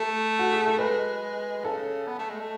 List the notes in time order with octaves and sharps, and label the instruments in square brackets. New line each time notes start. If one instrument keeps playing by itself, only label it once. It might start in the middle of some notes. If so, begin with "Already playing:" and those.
Already playing: [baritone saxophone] A3 [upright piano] A4
[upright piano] F#4
G#4
A4
[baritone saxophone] G#3 [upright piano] B4
[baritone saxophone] C#3 [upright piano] A4
[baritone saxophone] B3
A3
G#3
A3